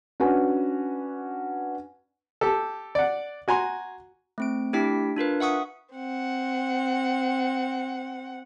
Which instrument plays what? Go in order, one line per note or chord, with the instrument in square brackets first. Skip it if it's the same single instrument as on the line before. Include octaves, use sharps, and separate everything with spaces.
[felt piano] C#4 D4 F#4 B4 G#5
[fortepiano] G4 A4
D5 F#5
F#4 G#5 A#5 C6
[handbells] A3 C4 D7
A3 D4 E4 G4 G5 B6
D4 F4 A#4 B4
E5 F#5 C#6 D#6
[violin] C4 F#5